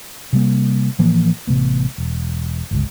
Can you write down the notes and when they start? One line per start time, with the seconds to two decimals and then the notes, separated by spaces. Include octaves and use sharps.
0.33 C3 G3 A#3
0.99 A2 E3 F3 A#3
1.47 A1 C3 A3 B3
1.98 E1
2.71 G1 C#2